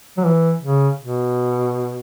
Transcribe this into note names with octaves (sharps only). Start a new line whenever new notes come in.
F#3
E3
C#3
B2